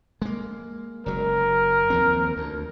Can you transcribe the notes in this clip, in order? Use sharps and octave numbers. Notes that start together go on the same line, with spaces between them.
G#3 A#3
F#1 F#3 A#4
D#2 F3 C4
D2